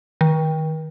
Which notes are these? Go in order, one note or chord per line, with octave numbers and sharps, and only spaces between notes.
D#3